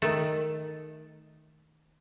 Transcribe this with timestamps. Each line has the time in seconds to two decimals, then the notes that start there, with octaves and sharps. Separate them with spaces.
0.02 D#3 A3